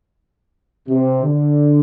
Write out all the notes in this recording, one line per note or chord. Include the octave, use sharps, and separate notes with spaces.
C3
D3